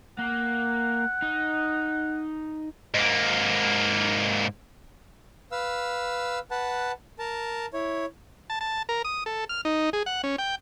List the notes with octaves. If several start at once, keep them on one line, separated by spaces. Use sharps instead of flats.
A#3 F#5
D#4
G#2 A#3
B4 F5 E6
B4 F#5 A5
A#4 A5
E4 C#5
A5
A5
A#4
D#6
A4
F6
D#4
G#4
F#5
C#4
G5